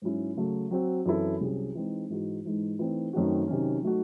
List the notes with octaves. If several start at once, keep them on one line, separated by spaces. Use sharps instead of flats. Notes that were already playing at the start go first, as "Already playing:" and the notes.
G#2 F#3 C#4 E4
C#3 F#3 A3
F#3 C4 F#4
F#2 E3 C4 E4 A4
C2 C3 F#3 C#4 G#4
E3 G#3 C4 D#4
G#2 E3 G#3 D#4 F#4
G#2 E3 G#3 D#4
E3 A3 C4 D#4
F#2 D#3 A3 C4 F#4
C3 D#3 F#3 C#4
F#3 A3 D#4 F#4